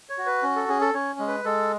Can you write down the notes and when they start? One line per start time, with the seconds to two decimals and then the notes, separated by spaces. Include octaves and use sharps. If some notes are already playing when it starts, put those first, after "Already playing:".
0.10 C#5
0.18 F#4
0.26 B4
0.43 C#4
0.56 A4
0.69 C#4 G#4
0.81 A4
0.94 C#4 C#5
1.19 G#3
1.27 B4
1.45 G#3 A4